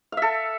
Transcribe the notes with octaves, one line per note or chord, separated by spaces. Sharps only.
A4 E5 F5